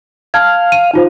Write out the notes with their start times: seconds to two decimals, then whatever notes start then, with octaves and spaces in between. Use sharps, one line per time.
0.34 F5 A5 F6 G#6
0.72 D#7
0.94 D#4 F4 C5